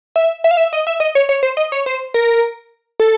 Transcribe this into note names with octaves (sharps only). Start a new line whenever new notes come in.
E5
E5
F5
E5
D#5
E5
D#5
C#5
C#5
C5
D#5
C#5
C5
A#4
A4